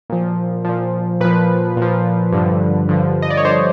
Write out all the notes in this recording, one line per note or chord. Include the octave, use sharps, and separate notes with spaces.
A#2 F3
A#2 F3
A#2 F3 B4
A#2
F3
G2 D3 F3
G2 D3 F3
D#5
D5
C#5
G2 D3 F3 C5